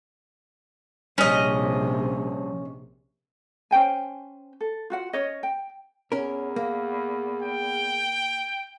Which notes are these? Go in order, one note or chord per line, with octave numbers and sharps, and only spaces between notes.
A#1 C3 F3 G3 C#4 D#5
C#4 C5 G5 G#5
A4
F4 F#4 F#5
C#4 C#5 D#5
G5
E2 C#4 A#4
A#3
G5